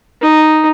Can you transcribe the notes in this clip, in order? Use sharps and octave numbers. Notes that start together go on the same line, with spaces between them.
D#4